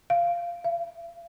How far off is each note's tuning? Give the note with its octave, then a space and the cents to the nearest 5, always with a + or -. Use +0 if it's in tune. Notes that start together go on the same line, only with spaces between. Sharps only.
F5 -10
F5 -45